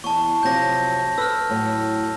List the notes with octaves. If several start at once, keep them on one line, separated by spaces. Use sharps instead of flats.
E2 A5 C#6
F2 C3 F#3 G6 A#6
A4 B4 E6 F6
A2 F#3